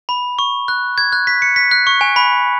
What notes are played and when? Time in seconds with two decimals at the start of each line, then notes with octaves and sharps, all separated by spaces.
0.09 B5
0.39 C#6
0.68 F#6
0.98 G#6
1.12 F#6
1.27 B6
1.42 C#7
1.56 B6
1.71 F#6
1.87 C#6
2.01 G#5
2.16 B5